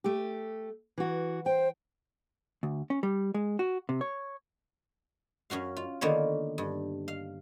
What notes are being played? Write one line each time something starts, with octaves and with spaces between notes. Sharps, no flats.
A3 G4
E3 F#4
C5 G5
D2
C#4
G3
G#3
F#4
C3
C#5
F#2 C#4 F#4 F5
F4
D3 D#3 A#3 B3 F4 C#5
G2
F5